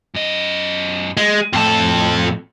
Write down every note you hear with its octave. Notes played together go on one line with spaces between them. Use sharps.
F#2 D#5
G#3
F2 A2 A4